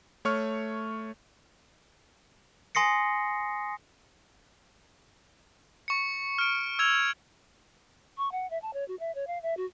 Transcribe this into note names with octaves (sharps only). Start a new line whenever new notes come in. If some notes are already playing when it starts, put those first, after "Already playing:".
A3 C#5 C#6 F6
G#5 C6 D#6 A#6 C7 C#7
C#6 C#7
F6 D7
E6 G#6 F7
C#6
F#5
E5
A5
C#5
F#4
E5
C#5
F5
E5
F#4